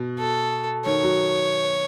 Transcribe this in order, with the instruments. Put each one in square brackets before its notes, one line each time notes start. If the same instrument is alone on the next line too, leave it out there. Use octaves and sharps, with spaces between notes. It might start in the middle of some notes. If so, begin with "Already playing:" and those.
Already playing: [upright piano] B2
[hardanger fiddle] A4
[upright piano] D#3 [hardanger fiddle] C#5
[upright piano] F#3